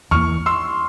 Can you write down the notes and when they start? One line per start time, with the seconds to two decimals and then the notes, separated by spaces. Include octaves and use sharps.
0.11 E2 E3 A#3 C#6 F6
0.46 C6 E6